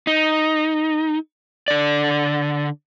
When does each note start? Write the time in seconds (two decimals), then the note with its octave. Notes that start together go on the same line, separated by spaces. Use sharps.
0.07 D#4
1.68 D3 D5